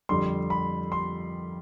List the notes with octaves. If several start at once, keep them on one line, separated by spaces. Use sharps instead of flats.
F2 D3 G3 C6
B5
C6